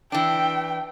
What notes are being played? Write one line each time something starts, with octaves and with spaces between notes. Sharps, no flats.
E3 D4 G5